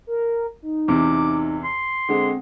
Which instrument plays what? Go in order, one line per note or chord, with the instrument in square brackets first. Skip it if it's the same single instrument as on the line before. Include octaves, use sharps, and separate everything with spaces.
[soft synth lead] A#4
D#4
[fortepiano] E2 C3 [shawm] D6
[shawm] C6
[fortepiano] D3 G#3 [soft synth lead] C4